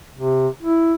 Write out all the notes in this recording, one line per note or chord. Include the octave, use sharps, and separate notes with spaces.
C3
E4